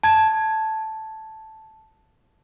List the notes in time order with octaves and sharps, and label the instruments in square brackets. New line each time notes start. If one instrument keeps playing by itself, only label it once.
[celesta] A5 G#6